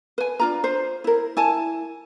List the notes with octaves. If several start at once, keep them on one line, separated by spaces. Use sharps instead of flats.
B4 G#5
D4 F4 A#5
C5
E4 A#4
E4 G#5 A5